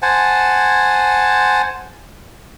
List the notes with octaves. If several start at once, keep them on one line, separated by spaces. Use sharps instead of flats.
C5 F#5 G#5 A5